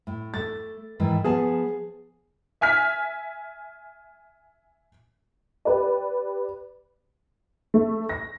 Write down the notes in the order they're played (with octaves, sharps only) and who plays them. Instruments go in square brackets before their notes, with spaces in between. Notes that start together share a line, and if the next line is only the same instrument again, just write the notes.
[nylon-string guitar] A2
[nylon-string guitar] A3 [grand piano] A6
[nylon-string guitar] G#2 D#3 E3
[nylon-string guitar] F3 B3 A5 [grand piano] G#4
[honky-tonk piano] E5 G#5 F6 B6
G4 B4 D5
A3
A#6